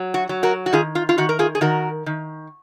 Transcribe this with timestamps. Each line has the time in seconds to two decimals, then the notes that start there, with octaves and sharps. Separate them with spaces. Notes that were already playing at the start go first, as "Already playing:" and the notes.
Already playing: F#3
0.14 F#4
0.29 F#3
0.43 F#4 A#4
0.66 F#4
0.73 D#3 F4 G#4
0.95 F4
1.09 F4
1.18 D#3 F#4
1.29 A#4
1.39 F4 G#4
1.55 G#4
1.61 D#3 F#4 A#4
2.06 D#3